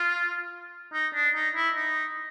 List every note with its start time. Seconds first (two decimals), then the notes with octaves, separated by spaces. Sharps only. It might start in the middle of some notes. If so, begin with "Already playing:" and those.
Already playing: F4
0.93 D#4
1.14 D4
1.35 D#4
1.55 E4
1.76 D#4